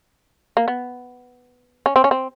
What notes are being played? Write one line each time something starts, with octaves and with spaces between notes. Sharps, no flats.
A#3
B3
C#4
C4
C#4
C4